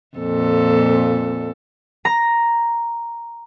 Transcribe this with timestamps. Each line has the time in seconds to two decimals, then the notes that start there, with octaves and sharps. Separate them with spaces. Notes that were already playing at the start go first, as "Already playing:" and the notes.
0.17 F2 A#2 A4
2.05 A#5 A#6